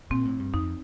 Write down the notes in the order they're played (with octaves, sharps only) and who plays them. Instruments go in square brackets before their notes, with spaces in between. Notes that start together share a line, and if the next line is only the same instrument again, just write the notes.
[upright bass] A#2 [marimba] C4
[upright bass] A2
G2
[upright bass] F2 [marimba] D#4